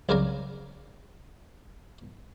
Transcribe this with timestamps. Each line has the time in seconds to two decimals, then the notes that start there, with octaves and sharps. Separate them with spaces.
0.09 C2 C#3 F#3 A#4 D5 G#5